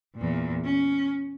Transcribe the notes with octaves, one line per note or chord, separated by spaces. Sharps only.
E2 A#2
C#4